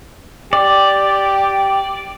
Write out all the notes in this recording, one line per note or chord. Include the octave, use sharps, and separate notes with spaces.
G4 D5